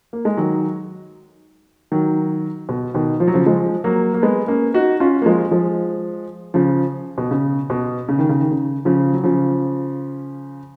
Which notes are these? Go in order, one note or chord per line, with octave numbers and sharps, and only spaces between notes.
A#3
G#3
D#3 F#3
D#3 F#3
B2
B2 D#3
F3
F#3
C#3 F3
F3 G#3
F#3 A#3
A#3
G#3 B3
A#3 C#4
D#4 F#4
C#4 F4
A#3
F3 G#3
F3 G#3
C#3 F3
B2
C#3
B2
C#3
D#3
C#3
D#3
C#3
C#3 F3
F#3
C#3 F3